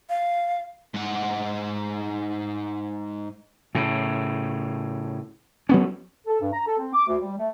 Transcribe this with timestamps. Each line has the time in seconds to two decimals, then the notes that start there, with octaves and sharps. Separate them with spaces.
0.10 F5
0.94 G#2 F#5
3.75 A2 C#3
5.69 F#3 B3 C#4
6.27 A4
6.41 G2
6.53 A#5
6.67 A4
6.78 C4
6.93 D6
7.07 D2
7.21 G3
7.38 A3